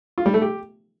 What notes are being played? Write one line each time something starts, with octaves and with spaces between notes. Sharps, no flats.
F4
G3
A3
G4